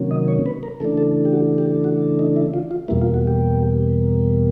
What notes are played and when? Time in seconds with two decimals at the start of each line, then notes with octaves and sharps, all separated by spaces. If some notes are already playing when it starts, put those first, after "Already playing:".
Already playing: C3 D#3 F#3 A#3 C#4
0.11 D#5
0.28 C#5
0.46 B4
0.63 A#4
0.80 C#3 E3 A3 D4 A4
0.97 A4
1.25 G4
1.33 F#4
1.58 G4
1.84 F#4
2.19 D#4
2.36 E4
2.54 F4
2.71 F4
2.88 E2 B2 G3 A#3 E4
3.02 F4
3.14 F#4
3.27 G4